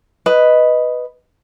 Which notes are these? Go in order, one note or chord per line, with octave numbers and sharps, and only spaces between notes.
B4 D#5